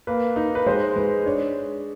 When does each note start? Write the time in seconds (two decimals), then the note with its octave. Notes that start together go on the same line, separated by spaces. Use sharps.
0.07 A#3 B4
0.36 D#4
0.55 B4
0.66 G#3 C5
0.95 G#3 B4
1.25 D4 C#5